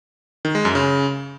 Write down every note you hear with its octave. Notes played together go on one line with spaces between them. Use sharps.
D#3
G#3
F#2
C#3